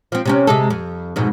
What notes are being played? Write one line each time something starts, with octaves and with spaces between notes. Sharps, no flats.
F3 C4
C3 C4 C#4
C3 G#3 A4
F2
F2 G#2 B2